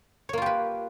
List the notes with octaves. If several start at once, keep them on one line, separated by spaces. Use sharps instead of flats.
A#3 F4 G4 B4 C#5